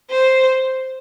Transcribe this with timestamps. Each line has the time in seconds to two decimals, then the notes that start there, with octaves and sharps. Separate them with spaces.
0.10 C5